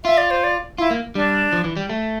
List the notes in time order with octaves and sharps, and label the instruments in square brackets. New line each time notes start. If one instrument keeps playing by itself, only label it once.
[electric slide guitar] F4 [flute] E5
[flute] D5
C5
D5
[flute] E4 [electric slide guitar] F4
[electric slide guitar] A#3
[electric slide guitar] G3 [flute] D4
[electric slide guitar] F3
E3
G3
A3